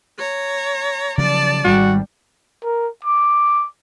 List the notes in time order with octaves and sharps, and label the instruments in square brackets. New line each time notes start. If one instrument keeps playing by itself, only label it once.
[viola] C#5 A#5
[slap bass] C#3 F3 F#3 [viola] D5 A5
[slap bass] G#1 G#2 G#3 [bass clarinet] G3 [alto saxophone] F#4
[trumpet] A#4
D6